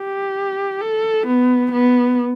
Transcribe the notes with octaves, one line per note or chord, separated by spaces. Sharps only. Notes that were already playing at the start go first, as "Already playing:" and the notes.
Already playing: G4
A4
B3
B3